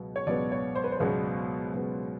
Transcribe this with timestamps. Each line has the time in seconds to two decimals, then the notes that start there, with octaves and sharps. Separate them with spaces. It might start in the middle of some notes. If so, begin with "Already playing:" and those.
Already playing: C#2 B2 F#3 B3
0.16 C#5
0.27 C#2 B2 F#3 B3 D5
0.52 C#5
0.75 C5
0.84 B4
0.92 C5
1.00 C#2 B2 F#3 B3 B4
1.73 C#2 B2 F#3 B3